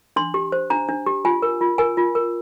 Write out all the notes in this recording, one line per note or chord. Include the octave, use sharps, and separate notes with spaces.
D4 C6
G4
C5
D4 A#5
D4
G4
F4 G#5
A#4
F4
A#4 G#5
F4
A#4